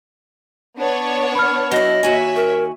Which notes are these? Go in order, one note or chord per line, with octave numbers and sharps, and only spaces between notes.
B3 D4 C#5
B5 F6
F#3 E4 D#5
D#2 F#4 C#5 E5 G#5
A#4